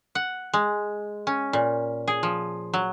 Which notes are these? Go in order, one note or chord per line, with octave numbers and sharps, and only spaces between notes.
F#5
G#3
C#4
A#2
G#4
F3
F#3